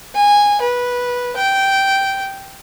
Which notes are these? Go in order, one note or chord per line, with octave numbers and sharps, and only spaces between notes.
G#5
B4
G5